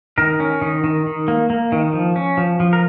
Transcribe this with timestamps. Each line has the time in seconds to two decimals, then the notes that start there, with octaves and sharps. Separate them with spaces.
0.18 D#3 A#4
0.40 C#4
0.61 D#3
0.84 D#3
1.06 D#3
1.28 A#3
1.50 A#3
1.72 D#3
1.93 F3
2.16 C#4
2.37 F3
2.60 F3
2.73 A#4